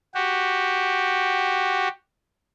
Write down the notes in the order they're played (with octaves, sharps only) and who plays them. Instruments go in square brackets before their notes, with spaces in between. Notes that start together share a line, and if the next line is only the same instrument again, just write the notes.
[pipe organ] F#4 G4